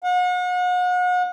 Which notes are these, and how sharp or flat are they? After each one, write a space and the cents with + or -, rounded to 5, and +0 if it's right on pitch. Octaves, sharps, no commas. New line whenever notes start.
F#5 -40